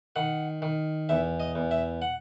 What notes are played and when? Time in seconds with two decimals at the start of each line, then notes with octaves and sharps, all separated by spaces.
0.16 D#3 F#5
0.62 D#3
1.09 E2 E5
1.40 D#5
1.55 E2
1.71 E5
2.02 F#5